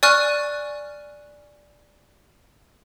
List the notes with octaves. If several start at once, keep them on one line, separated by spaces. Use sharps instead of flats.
D5 G#5 C#6 F6 F#6